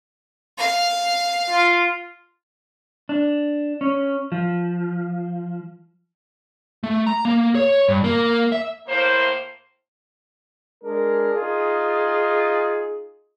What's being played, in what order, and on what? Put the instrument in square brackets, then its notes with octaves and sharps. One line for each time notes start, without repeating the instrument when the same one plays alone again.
[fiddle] F5
[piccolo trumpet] F4
[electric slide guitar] D4
C#4
F3
[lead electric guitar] A3
A#5
A#3
C#5
G2
A#3
E5
[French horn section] A2 A#3 C5
[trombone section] G#3 D4 G#4 A#4
D#4 F4 G#4